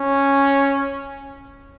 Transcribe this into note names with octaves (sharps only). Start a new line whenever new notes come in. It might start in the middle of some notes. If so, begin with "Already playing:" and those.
Already playing: C#4